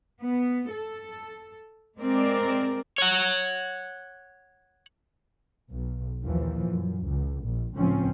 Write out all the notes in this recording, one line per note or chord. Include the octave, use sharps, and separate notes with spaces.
B3
A4
G#3 C4 A#4 D5
C#5 F#5
B1
D#2 A#2 E3 F3
F#2
C#2
A#1
C#2 A2 F3 C4 C#4